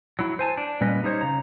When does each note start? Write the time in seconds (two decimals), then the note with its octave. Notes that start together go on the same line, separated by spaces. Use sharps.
0.19 F#3 E4
0.39 C5 G#5 A5
0.57 D4
0.81 A#2 G3 C#4 B4 D#5
1.03 G3 D#4 E4 C5 C#5
1.21 C#3 A#5